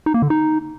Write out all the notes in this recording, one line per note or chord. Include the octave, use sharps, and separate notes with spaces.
D#4
A#3
D3
D#4